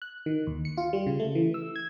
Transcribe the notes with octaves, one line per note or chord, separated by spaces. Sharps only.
F#6
D#3
D#2
C#7
F4
G3
C#3
A3
E3
E6
G#6